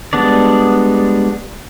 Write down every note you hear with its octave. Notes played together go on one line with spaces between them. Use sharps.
G3 G#3 B3 D4 D5